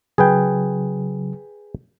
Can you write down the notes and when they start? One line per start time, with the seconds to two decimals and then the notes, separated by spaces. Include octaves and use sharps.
0.18 C#3 F#3 G#4 B4 G5